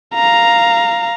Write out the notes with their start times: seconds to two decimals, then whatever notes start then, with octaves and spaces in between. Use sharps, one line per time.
0.14 F5 A#5